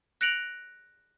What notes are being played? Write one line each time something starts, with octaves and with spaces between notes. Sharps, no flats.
F#6 A#6 C#7 D7 F7 F#7